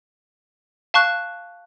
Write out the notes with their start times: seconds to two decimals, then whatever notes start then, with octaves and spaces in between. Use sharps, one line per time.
0.94 F5 A5 C#6 F#6